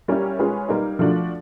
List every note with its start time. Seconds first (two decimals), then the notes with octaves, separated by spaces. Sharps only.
0.08 G3 A#3 C#4 E4 G4
0.39 G#3 C#4 F4 G#4 B4
0.69 G3 A#3 D#4
0.99 F3 A3 D4 F#4